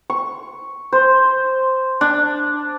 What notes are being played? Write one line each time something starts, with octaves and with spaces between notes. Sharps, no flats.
C#6
C5
D4